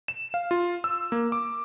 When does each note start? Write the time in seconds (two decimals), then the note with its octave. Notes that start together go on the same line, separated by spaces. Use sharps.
0.08 E7
0.34 F5
0.51 F4
0.84 E6
1.12 A#3
1.32 D6